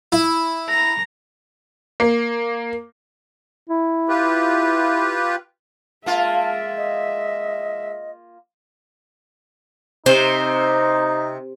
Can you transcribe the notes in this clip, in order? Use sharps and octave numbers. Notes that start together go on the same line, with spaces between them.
E4
A#5
A#3
E4
F4 G4 B4
G#3 A#3 F4 E5 A5
D#5
C3 D#4 C5